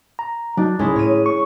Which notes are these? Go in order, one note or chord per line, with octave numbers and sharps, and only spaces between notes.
A#5
F#3 D4 D#4
C#2 G#3 C#4 E4
A2 C#5 D#7
C#6